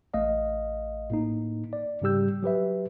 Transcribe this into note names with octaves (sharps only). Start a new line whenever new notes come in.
A1 A3 D#5 F5
A2 A#3 D#4
D5
G#2 C#3 G3 G4 E6 G6
F#3 G4 B4 E5